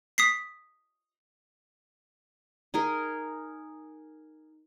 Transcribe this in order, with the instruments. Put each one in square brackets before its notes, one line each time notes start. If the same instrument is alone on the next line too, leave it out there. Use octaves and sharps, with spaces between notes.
[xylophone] D#6 B6 C7
[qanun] D#4 G#4 A#4